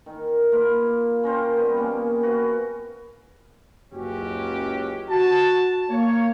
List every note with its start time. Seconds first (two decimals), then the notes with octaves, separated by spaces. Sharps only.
0.06 D#3
0.52 A#3 F4 B4 F5
1.24 C#4 A#4 C5 G5
1.57 G3 B3
1.77 A#3 C#4 G4
2.23 F#4 B4 F5
3.91 F#1 C#2 F#2 C#4 F#4 G4
5.09 F#4 A5
5.89 A#3 C#5